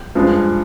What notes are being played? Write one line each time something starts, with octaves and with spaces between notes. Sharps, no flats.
G2 F3 G#3